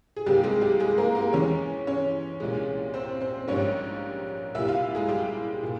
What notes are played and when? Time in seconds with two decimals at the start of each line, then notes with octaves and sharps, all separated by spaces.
0.17 G#4
0.26 C2 C3 G3 A#3 G4
0.44 G#3 G#4
0.61 G3 G4
0.80 G#3 G#4
0.98 A#3 A#4
1.15 A#3 A#4
1.33 E2 E3 G#3 C#4 C#5
1.87 C#4 C#5
2.40 C2 A#2 G#3
2.94 C4 C5
3.21 C4 C5
3.47 A#1 G#2 G3 A#3 C#4 C#5
4.55 C2 A#2 G3 A#3 E4 E5
4.68 F4 F5
4.95 G#3 G#4
5.09 G3 G4
5.63 A#2